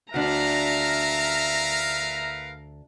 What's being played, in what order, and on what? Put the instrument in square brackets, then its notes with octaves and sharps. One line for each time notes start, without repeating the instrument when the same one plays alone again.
[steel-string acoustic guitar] D2 D4 [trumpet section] A#4 B4 F5 [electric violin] E5 A#5